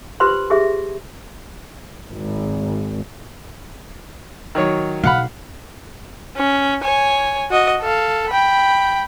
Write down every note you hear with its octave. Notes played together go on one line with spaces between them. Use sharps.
F4 G4 B4 C5 B5 C6
G4 G#4 E5
G#1
D#3 F#3 C#5
B1 F5 F#5 B5
C#4
C#5 G#5
F#4 D#5
A4 F5
G5 B5